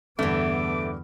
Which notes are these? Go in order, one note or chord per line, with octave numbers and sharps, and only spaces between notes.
E2 G2 D3 E3 A3 B3 D6